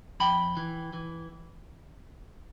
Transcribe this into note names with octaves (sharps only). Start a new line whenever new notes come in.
F2 G5 B5
E3
E3